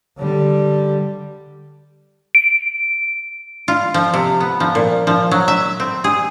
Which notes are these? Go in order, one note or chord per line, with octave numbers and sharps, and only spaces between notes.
D3 G3
D7
F4
F3
C3
B3
F3
A#2
F3
F#3
E5
C4
G#4